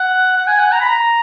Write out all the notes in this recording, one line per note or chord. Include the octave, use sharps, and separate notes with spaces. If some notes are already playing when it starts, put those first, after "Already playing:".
Already playing: F#5
F#5
G#5
F#5
A#5
B5
A#5